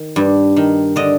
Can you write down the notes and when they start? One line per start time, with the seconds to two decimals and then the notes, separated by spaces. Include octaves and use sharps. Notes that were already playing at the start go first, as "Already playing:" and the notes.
Already playing: D#3
0.16 G2
0.56 D#3
0.96 D3 D#5